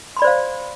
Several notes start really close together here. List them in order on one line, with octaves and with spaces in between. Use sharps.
C6 B5 D5 C5 F5